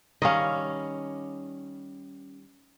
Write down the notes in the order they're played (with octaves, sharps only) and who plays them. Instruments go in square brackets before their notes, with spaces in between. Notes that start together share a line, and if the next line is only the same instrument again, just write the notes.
[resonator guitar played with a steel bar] D#3 G3 F5 [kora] C#4 D#5